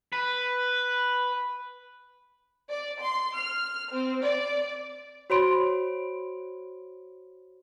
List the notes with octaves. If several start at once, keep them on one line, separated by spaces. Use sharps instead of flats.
B4
D5
C6
F6
C4
D5
F#4 C5 C#5 B5 C6 D7